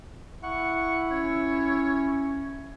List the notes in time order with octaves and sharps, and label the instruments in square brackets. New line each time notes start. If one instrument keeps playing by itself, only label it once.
[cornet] E4 [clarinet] F#5 [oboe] C#6
[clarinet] C#4 [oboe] C#5